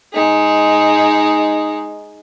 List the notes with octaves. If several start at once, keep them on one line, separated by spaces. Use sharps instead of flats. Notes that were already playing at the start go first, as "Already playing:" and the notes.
G#3 D#4